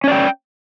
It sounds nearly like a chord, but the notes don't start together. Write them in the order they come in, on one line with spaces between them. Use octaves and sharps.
C#4 D5 G5